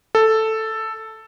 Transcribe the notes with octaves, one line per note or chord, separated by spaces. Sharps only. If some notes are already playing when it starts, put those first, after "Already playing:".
A4